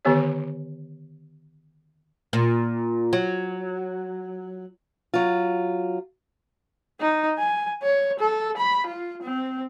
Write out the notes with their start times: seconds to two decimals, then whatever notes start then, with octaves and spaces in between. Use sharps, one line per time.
0.05 D3 D#3 B3 G4 C#5
2.33 A#2
3.13 F#3
5.14 F#3 F4
7.00 D#4
7.38 G#5
7.83 C#5
8.20 A4
8.57 B5
8.87 F4
9.22 C4